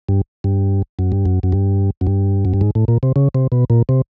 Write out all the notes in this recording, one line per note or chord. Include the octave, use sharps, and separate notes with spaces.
G2
G2
F#2
G2
F#2
F#2
G2
F#2
G2
F#2
G2
G#2
A2
A#2
C3
C#3
C3
B2
A#2
C3